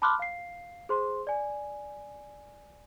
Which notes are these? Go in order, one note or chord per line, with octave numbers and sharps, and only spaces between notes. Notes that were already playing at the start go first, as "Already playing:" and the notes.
A5 B5 C6 D6 F6 F#6
F5 C7
G#4 C5 C6
D5 G#5